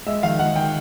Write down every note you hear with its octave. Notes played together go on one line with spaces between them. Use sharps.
G#3 E5
D#3 F5
G#3 F#5
D#3 G5